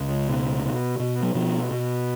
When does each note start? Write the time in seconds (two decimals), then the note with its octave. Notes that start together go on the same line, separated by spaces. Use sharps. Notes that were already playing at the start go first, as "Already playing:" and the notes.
Already playing: C#2
0.29 B2
0.65 B2
0.99 B2
1.23 F#3
1.34 B2 F3
1.71 B2